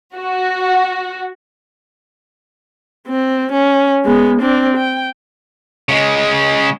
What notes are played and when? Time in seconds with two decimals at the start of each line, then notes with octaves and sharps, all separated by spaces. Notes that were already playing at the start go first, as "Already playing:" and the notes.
0.16 F#4
3.08 C4
3.52 C#4
4.04 G#3 B3
4.42 C4 D4
4.77 G5
5.89 C#3 G#3